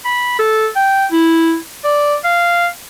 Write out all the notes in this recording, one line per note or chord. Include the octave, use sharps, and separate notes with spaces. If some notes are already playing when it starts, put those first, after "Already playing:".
B5
A4
G5
E4
D5
F5